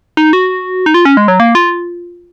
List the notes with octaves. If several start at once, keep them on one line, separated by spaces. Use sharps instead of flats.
D#4
F#4
D#4
F4
C#4
G#3
F#3
A#3
F4